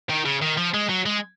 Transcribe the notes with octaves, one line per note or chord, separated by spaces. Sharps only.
D#3
C#3
D#3
F3
G#3
F#3
G#3